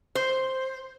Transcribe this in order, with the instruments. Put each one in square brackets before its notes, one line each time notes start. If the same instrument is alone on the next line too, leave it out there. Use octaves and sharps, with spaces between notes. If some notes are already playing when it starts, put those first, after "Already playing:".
[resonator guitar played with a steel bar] C5